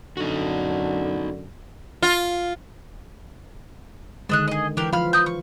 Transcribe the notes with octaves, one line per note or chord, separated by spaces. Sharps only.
F#2 D3 D#4 F#4
F4
D3 D#3 G#3 D4 D#5 F#6
G#4 D#5
E3 D4 G4 A#4
F3 F4 F5 B5 F6
D#6 G6
C#6